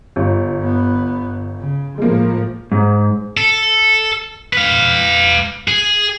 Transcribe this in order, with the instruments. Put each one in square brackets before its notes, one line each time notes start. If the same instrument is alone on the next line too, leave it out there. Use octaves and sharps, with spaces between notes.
[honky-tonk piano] G1
[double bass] B3
C#3
[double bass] A2 F3 [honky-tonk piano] G#3 A#3
[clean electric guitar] G#2
[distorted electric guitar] A4
B4 F5
G#4